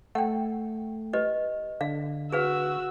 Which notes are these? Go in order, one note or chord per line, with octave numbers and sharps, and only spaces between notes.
A3 F#5 G5
G4 B4 D#5
D3 F5
F#4 G#4 B4 F5 E6